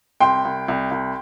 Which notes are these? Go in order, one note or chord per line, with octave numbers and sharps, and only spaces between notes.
C2 G5 C6
C2
C2
C2